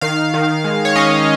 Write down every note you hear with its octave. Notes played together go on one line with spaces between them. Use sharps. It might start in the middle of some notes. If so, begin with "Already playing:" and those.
D#3 F5
D#3
G#3
C#5
C#4 D#5